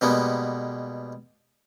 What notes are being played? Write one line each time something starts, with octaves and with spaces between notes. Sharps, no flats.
B2 G3 G#3 A#3 B3